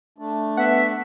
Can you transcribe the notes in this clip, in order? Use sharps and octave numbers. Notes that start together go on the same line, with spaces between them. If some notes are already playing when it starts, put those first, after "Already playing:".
A3 D4
B3 E5 F#5